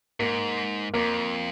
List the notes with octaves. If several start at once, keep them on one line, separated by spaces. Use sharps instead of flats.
G#2 A#3
F2 A#3